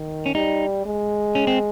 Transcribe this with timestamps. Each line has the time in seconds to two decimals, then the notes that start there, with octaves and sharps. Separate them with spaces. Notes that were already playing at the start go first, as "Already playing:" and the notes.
Already playing: D#3
0.26 C#4
0.35 G3 D#4
0.86 G#3
1.35 C#4
1.47 C4